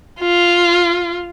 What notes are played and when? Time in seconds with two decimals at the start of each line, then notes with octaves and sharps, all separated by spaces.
0.20 F4